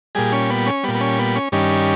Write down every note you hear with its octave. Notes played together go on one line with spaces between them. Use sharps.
A#2 G3 G#4
C#4
B3
C#4
A#2 G3 B3
B3
C#4
B3
C#4
G2 D#3 G3 C#4